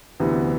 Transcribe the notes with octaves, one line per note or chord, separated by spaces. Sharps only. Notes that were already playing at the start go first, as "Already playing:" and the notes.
D2 C3 E3 B3